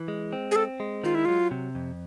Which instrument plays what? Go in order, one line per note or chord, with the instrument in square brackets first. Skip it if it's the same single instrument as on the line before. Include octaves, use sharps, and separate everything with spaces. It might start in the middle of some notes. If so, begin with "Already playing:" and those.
Already playing: [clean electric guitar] E3
G#3
C4
[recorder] G#4
[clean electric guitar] C4 [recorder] A4
[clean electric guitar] G#3
[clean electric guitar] D#3 [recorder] F4
[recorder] E4
[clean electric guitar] F#3 [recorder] F4
[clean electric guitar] C3
F2